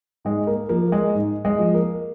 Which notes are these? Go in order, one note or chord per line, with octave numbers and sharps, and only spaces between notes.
G#2 G#3
A#3
F3 A#3
G#3
G#2
G#3
F3
A#3